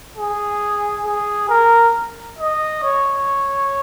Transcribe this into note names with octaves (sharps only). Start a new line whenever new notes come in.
G#4
G#4
A#4
D#5
C#5